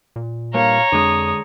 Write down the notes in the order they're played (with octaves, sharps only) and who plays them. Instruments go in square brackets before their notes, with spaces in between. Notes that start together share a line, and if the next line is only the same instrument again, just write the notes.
[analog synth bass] A#2
[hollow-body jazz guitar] G2 A#3 [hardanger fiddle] C#5 A#5 [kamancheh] F5
[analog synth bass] F2 [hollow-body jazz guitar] D3 G#3 [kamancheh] D#6